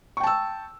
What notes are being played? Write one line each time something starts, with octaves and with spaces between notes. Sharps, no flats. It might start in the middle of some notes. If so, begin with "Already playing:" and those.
G5 A5 C#6 E6